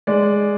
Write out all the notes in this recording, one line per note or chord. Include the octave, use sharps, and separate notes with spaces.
G#3 D5